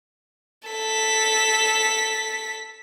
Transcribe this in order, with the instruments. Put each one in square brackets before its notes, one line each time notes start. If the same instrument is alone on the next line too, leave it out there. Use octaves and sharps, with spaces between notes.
[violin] A4 B6